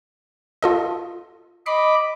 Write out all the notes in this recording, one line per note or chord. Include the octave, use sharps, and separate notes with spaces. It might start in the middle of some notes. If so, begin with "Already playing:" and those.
F4 A4 D#5
D#5 B5 D6 C7